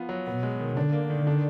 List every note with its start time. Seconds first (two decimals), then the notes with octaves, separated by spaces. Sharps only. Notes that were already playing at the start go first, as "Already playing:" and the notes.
Already playing: F3 B3 F4
0.09 F#3
0.26 B2 B3
0.43 G#3
0.60 D#3
0.76 D3 D4
0.92 A#3
1.10 D#3
1.27 D4